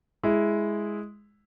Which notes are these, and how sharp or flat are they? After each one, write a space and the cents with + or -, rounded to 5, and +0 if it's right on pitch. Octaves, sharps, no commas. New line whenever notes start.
G#3 +0 E4 +0